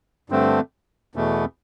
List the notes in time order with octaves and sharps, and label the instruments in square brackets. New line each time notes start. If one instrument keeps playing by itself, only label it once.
[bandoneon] G2 D3 A3 C4
E2 B2 A3